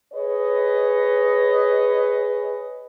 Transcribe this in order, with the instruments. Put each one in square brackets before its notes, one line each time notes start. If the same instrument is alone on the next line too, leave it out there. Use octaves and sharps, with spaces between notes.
[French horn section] G#4 B4 C#5 D#5